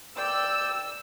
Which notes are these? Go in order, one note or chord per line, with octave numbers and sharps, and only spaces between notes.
D5 G5 E6 G6